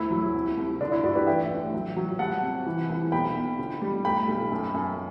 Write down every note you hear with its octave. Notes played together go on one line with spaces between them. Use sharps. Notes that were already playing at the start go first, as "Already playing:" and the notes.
Already playing: D2 E4
F#3
C2
C2
D3 D4
E4
G2 D4 F#4
G4 B4
A1 E5 G5
A1
F#3
F#3
G3 F#5 A5
C3
E3
C2
B1 G5 B5
B2
D3
G3
A3 G5 B5
B1
F#2
F#2